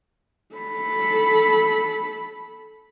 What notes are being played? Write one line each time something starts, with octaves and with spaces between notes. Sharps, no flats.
A4 B5